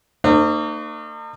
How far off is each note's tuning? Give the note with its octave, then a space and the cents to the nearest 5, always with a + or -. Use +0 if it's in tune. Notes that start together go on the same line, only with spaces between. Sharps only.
A#3 -45 D#4 -40 C5 +0